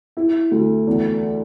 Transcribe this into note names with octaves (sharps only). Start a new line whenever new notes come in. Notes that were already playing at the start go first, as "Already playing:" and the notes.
E4
D2
E2